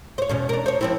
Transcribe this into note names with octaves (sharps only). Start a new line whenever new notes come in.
C5 C#5
E2 B2 C#4
D4 A#4
C5 C#5
F3 C4 E4